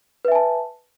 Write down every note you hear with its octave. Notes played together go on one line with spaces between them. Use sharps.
B4 E5 G#5 A5